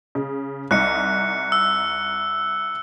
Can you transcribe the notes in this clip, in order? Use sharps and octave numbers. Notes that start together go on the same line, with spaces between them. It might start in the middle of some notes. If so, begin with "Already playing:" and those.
C#3
C2 D#4 F#6 C#7
E6